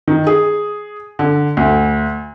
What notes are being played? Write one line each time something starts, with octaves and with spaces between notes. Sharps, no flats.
D#3
G#4
D3
D2